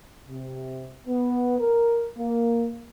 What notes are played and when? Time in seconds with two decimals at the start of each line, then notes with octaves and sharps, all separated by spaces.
0.28 C3
1.07 B3
1.60 A#4
2.18 A#3